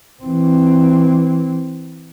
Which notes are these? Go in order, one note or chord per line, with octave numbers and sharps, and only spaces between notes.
E3 C4